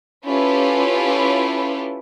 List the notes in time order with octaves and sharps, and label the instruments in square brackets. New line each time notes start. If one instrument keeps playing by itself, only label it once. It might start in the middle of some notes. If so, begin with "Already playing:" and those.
[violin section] C#4 E4 F4 G4 A4 B4